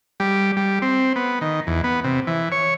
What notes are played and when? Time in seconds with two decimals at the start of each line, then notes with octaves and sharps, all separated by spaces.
0.20 G3
0.57 G3
0.82 C4
1.16 B3
1.41 D#3
1.67 E2
1.84 B3
2.04 C3
2.27 E3
2.52 C#5